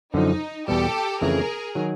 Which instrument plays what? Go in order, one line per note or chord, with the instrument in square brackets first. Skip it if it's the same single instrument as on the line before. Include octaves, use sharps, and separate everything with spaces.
[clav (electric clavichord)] F#2 D3 F3 [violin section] D#4
[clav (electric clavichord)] E2 B2 G3 [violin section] G4 A4
[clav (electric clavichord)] F2 C#3 E3 A3 [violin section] G#4 A#4
[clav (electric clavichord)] D#3 F#3